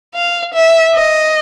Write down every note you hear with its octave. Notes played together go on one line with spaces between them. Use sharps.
F5
E5
D#5